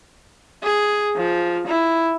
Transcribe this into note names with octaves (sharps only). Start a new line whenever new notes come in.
G#4
F3
E4